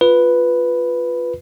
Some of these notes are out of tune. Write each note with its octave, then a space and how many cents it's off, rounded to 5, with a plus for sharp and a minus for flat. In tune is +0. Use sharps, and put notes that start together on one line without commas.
F4 +5 B4 +0